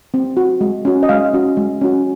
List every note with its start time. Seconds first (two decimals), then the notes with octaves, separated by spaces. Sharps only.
0.14 C4
0.37 F#4
0.61 G#3
0.85 C#4 F#4
1.03 D#5
1.09 G#3 F5
1.34 C#4 F#4
1.57 G#3
1.81 C#4 F#4